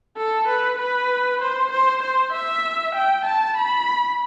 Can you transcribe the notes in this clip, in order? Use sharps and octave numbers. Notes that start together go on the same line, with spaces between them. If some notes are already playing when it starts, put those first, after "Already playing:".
A4
B4
B4
C5
C5
C5
E5
G5
A5
B5